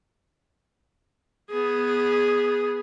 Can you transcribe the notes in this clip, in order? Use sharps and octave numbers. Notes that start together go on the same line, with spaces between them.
B3 G#4